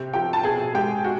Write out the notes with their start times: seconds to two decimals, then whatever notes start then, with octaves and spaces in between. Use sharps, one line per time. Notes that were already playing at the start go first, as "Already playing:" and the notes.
Already playing: C3 G4
0.13 F3 G4 G5
0.33 A5
0.43 B2 G#4 G#5
0.74 G#3 G4 G5
1.04 F#4